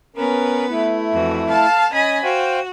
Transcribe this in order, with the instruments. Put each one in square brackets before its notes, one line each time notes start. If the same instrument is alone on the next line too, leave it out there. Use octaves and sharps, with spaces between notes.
[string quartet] B3 B4 [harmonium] C#4 A#4
[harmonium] A3 E4
[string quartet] F2 E3 F#4
A4 F5 A5
[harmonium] C#4 [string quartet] D#5 G#5 B5
[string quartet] F#4 [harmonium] C5 F5 G5